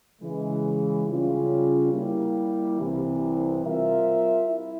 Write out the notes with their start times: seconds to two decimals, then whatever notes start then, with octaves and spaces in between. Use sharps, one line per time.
0.22 C#3 E3 G#3
1.07 C#3 G3 C#4 F4
1.93 G3 A#3 E4
2.77 C2 C3 E3
3.63 G3 C4 F4 A#4 E5
4.48 E4